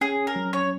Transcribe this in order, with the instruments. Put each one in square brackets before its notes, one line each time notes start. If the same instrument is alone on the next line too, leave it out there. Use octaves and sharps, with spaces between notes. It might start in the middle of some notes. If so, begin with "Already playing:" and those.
[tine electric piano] C#4 [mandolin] G#4
[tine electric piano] C#4
[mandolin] A#4
[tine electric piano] F#3
[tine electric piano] C#4 [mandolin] C#5